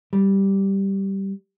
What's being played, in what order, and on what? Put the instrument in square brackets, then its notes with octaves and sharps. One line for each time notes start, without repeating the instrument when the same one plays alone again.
[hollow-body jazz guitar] G3